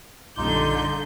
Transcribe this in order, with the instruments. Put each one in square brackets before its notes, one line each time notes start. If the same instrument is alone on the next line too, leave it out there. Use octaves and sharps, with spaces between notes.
[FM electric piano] A#1 F#2 G3 [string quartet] D3 G6 [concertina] D#4 F4 [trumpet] D6